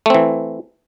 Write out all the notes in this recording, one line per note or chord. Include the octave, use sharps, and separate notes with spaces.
E3 A3 C4